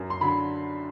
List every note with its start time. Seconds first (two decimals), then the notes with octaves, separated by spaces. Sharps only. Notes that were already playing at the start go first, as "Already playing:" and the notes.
Already playing: F#2
0.10 C6
0.21 D3 F#3 B5